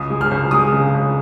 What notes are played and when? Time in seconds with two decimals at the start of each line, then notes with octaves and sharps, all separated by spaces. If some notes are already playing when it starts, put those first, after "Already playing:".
Already playing: C#2 D#6
0.10 G#3
0.21 F6
0.31 C#2
0.51 G#3 D#6
0.73 C#3
0.94 C#2